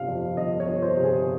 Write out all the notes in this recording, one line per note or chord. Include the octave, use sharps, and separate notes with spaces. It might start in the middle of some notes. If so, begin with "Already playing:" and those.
Already playing: G1 C3 F5
F2
G1 D#5
C#5
G1
C5
C3
G#4